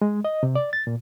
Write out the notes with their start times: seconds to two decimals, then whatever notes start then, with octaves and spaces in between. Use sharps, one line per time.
0.02 G#3
0.25 D#5
0.43 C3
0.55 D5
0.73 A6
0.87 A#2